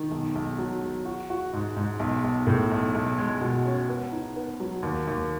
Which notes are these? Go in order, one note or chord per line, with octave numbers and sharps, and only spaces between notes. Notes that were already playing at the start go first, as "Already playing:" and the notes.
Already playing: D#3
B1
B1
F#3
F#3
F#4
F#4
G#2
G#2
B1
B1
A2
B1
B1
G#3
B2
C#4
B3
D#4
B3
F#3
D#2
D#2